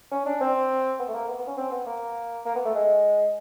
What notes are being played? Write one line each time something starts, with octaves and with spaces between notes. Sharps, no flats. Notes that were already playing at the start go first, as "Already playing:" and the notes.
C#4
D4
C4
B3
A3
A#3
B3
B3
C#4
C4
B3
A#3
A#3
B3
A3
G#3